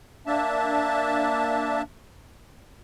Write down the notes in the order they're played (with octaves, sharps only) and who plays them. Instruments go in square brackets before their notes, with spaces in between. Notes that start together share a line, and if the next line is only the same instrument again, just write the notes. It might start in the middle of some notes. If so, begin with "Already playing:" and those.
[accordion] A#3 D4 E5 A5